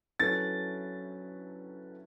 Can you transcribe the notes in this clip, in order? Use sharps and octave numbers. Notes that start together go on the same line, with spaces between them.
F#3 A3 C#4 E4 B4 A6